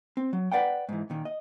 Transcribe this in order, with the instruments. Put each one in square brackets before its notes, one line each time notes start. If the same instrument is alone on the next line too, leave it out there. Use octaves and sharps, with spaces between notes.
[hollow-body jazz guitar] C4
F#3
B4 C5 D5 F#5 G5
G#2 E3
A#2 D#3
D#5